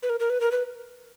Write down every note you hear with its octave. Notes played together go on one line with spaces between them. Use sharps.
B4
A#4
A#4
B4
A#4
B4